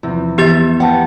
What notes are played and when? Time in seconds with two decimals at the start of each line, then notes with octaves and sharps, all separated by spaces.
0.03 E2 C3 F3
0.38 E3 B3 G4 E5 G6 A6
0.80 A#3 B3 F#5 G5 A5